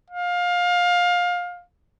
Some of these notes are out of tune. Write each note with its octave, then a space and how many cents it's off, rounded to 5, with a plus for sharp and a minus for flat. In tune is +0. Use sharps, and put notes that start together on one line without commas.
F5 +20